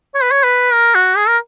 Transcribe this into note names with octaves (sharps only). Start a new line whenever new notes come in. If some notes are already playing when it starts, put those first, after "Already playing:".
C#5
B4
C#5
B4
A#4
F#4
G#4
A#4